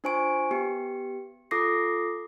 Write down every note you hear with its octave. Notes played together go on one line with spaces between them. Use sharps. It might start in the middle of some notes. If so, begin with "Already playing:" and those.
D4 F4 C5 G#5 C#6 D7
B3 G4 C#7
F4 A4 D6 D#6 A#6 C7